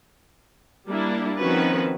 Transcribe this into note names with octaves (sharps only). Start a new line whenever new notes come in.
G3 A#3 D4 E4
D#3 F3 C4 C#4 F#4 B4